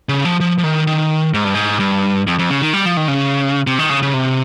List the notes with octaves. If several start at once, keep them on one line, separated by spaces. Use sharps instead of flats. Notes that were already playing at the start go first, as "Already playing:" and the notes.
C#3
F3
F3
F3
D#3
D#3
G#2
G2
G#2
G2
F2
F2
C#3
D#3
G3
F3
D#3
C#3
C3
D#3
C#3
C#3
C3